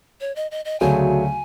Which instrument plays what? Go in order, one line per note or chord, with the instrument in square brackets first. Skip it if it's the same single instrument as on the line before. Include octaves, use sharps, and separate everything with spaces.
[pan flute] C#5
D#5
D#5
D#5
[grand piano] D2 C#3 F#3 A3 [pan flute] G#5